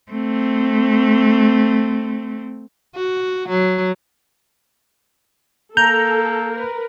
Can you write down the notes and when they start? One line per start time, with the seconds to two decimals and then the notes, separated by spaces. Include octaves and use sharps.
0.12 A3 C4
2.95 F#4
3.49 F#3
5.77 A#3 A4 A#5 G6
6.52 A#4 B4